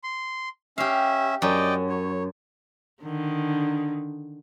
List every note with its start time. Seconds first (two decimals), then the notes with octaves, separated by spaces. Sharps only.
0.03 C6
0.78 C#4 G4 E5 F5
1.42 F#2 D5 D#5 G5
1.89 C#5
3.03 D3 D#3